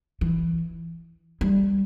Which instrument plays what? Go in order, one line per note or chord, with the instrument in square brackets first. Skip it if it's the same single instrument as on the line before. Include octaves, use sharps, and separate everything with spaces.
[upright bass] E3
G3